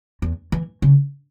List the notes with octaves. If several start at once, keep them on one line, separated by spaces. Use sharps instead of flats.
E2
E3
C#3